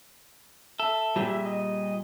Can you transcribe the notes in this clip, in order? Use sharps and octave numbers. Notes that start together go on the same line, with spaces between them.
A4 E5
A#2 G3 G4 G#4
D#5